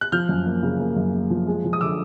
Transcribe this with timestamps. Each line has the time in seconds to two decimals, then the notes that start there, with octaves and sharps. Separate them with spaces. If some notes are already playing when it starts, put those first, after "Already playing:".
0.01 F#6
0.12 F3 F6 G6
0.29 F#2
0.46 A#3
0.63 C#3
0.80 A#3
0.96 F#2
1.13 A#3
1.30 F3
1.47 G#3
1.64 F3
1.73 D#6
1.81 D3 D6 E6